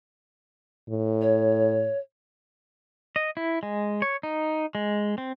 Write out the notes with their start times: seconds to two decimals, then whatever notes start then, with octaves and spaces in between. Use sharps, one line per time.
0.90 A2
1.21 C#5
3.16 D#5
3.37 E4
3.63 G#3
4.02 C#5
4.23 D#4
4.75 G#3
5.18 C4